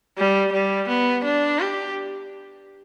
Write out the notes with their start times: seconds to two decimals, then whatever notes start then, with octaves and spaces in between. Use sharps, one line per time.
0.18 G3
0.52 G3
0.89 B3
1.24 D4
1.59 G4